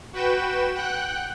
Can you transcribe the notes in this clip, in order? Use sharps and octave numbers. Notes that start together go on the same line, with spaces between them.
F#4 B4 G5 E7
F#5 G5 F#6